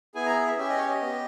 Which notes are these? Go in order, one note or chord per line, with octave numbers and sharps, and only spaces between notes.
B3 E4 G#4 G#5
A#5
E5
C#4 G4 E5
D#5
C#5
D#5
B3 G4